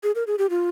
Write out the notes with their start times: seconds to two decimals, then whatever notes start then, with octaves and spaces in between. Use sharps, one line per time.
0.03 G#4
0.15 A#4
0.27 G#4
0.38 G4
0.50 F4